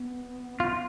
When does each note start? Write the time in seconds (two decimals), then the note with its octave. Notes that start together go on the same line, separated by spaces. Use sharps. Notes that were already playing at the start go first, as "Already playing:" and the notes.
Already playing: B3
0.60 B3 F4